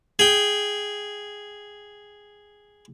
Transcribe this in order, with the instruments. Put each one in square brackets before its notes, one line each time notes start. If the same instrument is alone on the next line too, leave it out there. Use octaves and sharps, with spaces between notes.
[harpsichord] G#4 G5